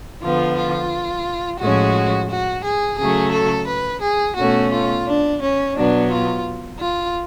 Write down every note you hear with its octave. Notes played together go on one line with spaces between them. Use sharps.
D3 F3 B3 F4
F4
A2 F3 G#3 C#4 F#4
F#4
G#4
C#3 F#3 A3 G#4
A4
B4
G#4
B2 A3 C#4 F#4
F4
D4
C#4
B2 F#3 B3 D4
F4
F4